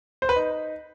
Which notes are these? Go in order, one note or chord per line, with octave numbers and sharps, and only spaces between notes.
C5
B4
D#4